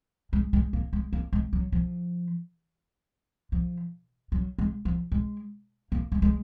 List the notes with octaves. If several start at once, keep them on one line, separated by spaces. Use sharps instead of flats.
G#3
G#3
A#3
G#3
A#3
G#3
F#3
F3
F3
F#3
G#3
F3
G#3
A#3
G#3
G#3